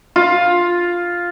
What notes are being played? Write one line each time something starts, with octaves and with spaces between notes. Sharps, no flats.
F4